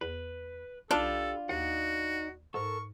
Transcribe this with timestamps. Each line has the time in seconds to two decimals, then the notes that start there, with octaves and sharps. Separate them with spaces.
0.01 E2 B4
0.91 B1 D4 F4 G4 A4 B5
1.49 D#2 D#4 F#4 D5 F#5
2.54 G#2 A4 A#4 C#6